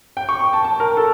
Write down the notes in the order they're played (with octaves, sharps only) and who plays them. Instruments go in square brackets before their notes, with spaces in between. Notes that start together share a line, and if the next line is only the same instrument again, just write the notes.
[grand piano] G5
C#6
C#6
A5
A5
A#4
A4